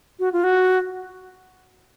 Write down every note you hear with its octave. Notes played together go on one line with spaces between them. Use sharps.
F#4
F4
F#4